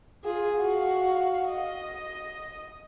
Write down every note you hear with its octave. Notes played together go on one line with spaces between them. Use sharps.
F4 G#4
F#4 F5
D#5